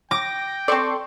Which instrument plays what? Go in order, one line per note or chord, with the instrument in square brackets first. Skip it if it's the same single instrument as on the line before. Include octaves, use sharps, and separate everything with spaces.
[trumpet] G5 [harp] D6 [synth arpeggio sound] A#6
[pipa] C4 D5 [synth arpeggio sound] A4 C6 C#6